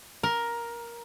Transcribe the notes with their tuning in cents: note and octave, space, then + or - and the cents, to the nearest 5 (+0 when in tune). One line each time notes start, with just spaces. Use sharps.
A#4 +10